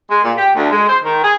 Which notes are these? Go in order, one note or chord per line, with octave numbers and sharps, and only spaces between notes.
G#3
A#2
G4
D2
G#3
C5
D#3
G#4